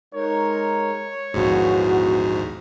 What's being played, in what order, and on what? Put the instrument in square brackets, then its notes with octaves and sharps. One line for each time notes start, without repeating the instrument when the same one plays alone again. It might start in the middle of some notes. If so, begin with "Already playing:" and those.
[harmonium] G#3 D#4 A#4 [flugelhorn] C#5
[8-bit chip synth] A#1 D#2 G#2 [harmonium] E3 B3 [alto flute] F#4